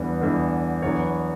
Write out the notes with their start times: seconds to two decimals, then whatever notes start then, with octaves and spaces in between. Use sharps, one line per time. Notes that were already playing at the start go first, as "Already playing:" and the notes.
Already playing: E2 D3 G3 B3
0.21 E2 D3 G3 B3
0.82 E2 D3 F#3 B3 C#5